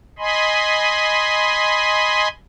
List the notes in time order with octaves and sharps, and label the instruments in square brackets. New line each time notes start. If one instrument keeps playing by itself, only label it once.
[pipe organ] D#5 G#5 B5 C6